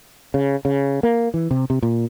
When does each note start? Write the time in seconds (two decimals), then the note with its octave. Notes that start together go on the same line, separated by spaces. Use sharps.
0.34 C#3
0.65 C#3
1.03 A#3
1.34 E3
1.51 C3
1.70 C3
1.83 A#2